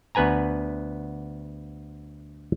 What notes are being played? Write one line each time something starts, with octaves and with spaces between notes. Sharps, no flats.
D2 B3 B4 G#5 A#5